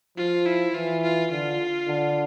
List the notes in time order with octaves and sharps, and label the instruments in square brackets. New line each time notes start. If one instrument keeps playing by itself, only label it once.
[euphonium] F3 [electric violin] F4
[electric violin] E4
[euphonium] E3 [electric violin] F4
[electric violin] F4
[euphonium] D3 [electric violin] F4
[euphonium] D3